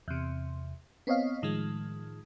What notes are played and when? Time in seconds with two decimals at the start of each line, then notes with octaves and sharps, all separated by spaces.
0.08 E2 C3
1.07 B3 C4 C#5 D#5 F5
1.42 A2 D#3 F3 G#3